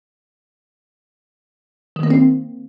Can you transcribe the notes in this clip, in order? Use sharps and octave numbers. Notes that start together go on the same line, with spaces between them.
D#3
A#3
C4